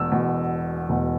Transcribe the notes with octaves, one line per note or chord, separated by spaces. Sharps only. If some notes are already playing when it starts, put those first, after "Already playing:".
Already playing: E1 E2 B2 E6
E1 E2 B2
E1 E2 B2